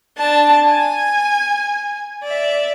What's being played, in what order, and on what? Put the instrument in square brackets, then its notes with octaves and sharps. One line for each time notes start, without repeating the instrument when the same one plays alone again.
[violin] D4 A5
G#5
D5 E5